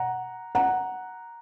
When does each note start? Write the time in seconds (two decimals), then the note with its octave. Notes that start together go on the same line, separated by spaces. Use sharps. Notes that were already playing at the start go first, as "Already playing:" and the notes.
Already playing: F#5 A#5
0.55 F#5 A#5